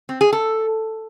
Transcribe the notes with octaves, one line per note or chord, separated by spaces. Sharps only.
C4
G#4
A4